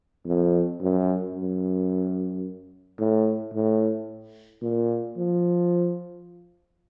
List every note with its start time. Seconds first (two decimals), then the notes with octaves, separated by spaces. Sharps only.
0.26 F2
0.81 F#2
1.35 F#2
2.99 A2
3.53 A2
4.62 A#2
5.17 F3